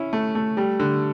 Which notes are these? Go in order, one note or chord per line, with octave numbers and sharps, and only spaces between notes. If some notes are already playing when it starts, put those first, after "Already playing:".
Already playing: C#4 E4
A3
A3
G3
D3